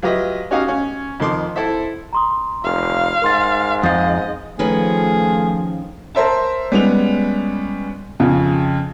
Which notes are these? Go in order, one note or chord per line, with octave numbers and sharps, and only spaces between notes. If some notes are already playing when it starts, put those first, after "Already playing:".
F#3 F4 G4 B4 D#5 E5
C#4 D#4 F#4 G4 D#5 F5
C#4
F2 D#3 C6 D6
C4 E4 A4 C5 E5
A#5 C6 D#6
F1 F5
G#2 A#4 C6 A6
F2 D#5 F5 D#6 G6 A6
D#3 F3 A3 C#4 G#4 B4
A#4 C5 E5 A5
G3 G#3 B3 C#4 F7
F2 C#3